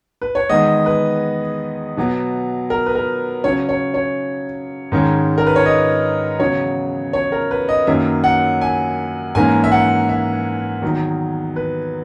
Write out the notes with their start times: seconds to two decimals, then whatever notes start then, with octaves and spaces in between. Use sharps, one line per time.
0.22 B4
0.35 C#5
0.49 E2 D#3 G#3 B3 D#5
0.86 B4
1.97 B2 F#3 B3
2.70 A#4
2.86 B4
2.95 A#4
3.44 C#3 F#3 C#4 C#5
3.69 C#5
3.94 C#5
4.92 G#2 D#3 G#3 C#4
5.38 A#4
5.47 B4
5.56 C#5
5.66 D#5
6.39 E2 C#3 F#3 C#5
7.13 C#5
7.32 A#4
7.51 B4
7.69 D#5
7.87 F#2 D#3 A#3 C#4 E5
8.24 F#5
8.61 G#5
9.35 G#2 E3 A#3 C#4 G#5
9.64 E5
9.72 F#5
10.09 E5
10.82 E2 D#3 F#3
11.56 B4